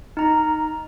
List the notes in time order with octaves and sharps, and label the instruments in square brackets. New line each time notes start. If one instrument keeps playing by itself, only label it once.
[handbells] D#4 A#5